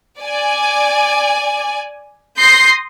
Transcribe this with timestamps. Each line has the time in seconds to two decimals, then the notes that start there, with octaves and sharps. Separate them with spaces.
0.21 D5 G#5
2.39 C6 D#6 G6 A#6 C7